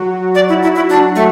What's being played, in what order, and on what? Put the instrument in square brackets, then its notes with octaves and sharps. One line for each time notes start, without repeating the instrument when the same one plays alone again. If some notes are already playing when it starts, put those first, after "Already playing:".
Already playing: [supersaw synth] F#3 F#4
[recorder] D5
E4
E4
E4
D4
A3